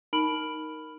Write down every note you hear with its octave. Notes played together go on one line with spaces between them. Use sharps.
D#4 A#4 B5 F6 D7 F#7